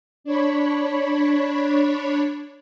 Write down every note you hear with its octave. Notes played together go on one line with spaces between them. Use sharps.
D4 C#5 B5